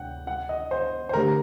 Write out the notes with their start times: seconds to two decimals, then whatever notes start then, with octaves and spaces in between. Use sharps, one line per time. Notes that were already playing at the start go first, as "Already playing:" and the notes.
Already playing: D2 C3 F#5 G5
0.27 F#5
0.49 D#5
0.71 C5
1.09 C5
1.14 D3 A3 D4 G4 A#4